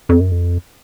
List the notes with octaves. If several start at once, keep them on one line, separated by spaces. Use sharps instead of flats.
F2
F#2
F2